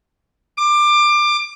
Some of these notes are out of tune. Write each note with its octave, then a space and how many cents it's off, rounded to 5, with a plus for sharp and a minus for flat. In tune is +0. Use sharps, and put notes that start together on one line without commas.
D6 +20